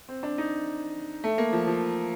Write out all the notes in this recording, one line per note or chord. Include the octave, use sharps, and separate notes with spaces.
C4
D4
D#4
A3
A#3
F3
F3